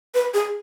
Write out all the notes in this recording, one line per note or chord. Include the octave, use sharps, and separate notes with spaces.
B4
G#4